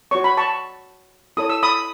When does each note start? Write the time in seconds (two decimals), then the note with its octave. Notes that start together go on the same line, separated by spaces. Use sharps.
0.11 F#4 C#5 C#6
0.24 B5
0.37 A5 C#6
1.37 E4 A4 C#5 D#6
1.49 E6
1.63 B5 D#6